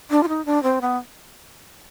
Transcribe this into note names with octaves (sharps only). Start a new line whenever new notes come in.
D4
F4
D#4
D4
C4
B3